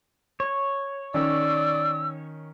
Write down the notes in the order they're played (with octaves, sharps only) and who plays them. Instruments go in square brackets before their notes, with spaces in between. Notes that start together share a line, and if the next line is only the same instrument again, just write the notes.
[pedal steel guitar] C#5
[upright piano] D#3 C#4 [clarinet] D5 [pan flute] E6